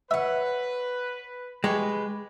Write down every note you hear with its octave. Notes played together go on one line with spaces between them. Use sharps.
B4 C#5 E5 F#5
G#3 G4 B4 C#6